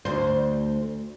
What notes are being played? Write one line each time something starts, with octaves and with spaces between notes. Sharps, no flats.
D2 C5